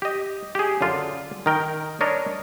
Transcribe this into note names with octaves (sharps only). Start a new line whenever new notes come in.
G4 D#5
G4 G#4
F#2 D3 F4 D5
D#3 A#4 G5
D4 A#4 C#5 D#5